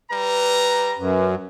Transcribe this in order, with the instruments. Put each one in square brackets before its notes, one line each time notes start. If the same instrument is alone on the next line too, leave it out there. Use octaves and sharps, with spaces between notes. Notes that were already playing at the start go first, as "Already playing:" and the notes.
[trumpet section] G3 A#5 [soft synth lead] B4
[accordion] F#2